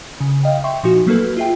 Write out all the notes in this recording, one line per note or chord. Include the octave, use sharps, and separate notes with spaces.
C#3
D#5 F5 G5
E5 G5 C6 C#6
A#2 F3 D#4 F#4
F#3 A3 A#3 F#4 A4 B4
F4 G#4 E5 G5